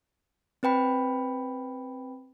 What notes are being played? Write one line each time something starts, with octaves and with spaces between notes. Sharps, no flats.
C4 B4 G5 B5